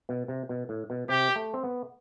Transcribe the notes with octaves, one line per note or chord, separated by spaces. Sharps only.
B2
C3
B2
A2
B2
C3 G4
A3
C4
B3